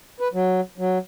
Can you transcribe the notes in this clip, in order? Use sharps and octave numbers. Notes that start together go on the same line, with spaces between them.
B4
F#3
F#3